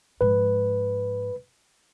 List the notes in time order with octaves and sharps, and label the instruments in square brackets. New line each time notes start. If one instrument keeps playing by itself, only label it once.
[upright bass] G#2 F3 [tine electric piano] B4